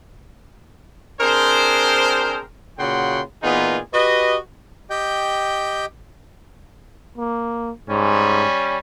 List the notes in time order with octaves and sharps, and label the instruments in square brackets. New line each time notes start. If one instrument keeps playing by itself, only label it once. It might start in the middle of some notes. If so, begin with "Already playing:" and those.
[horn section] C4 D4 G#4 A#4 C5
A#2 C#3 F#4 F#5 G5 C6
A#2 E3 B3 D#4 F4 G#4
F#4 G4 B4 D#5
[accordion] G4 D#5 G5 G6
[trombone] A#3
[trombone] G#2 [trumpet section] G3 C#4